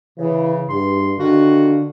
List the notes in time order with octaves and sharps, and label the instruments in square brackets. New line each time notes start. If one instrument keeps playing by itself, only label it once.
[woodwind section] C#3 [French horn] E3
[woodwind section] E2 C6 [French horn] G2
[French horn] D3 [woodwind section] D#3 F4 F#4